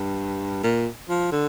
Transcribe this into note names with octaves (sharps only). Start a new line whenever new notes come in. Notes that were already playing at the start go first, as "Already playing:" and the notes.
Already playing: G2
A#2
F3
D3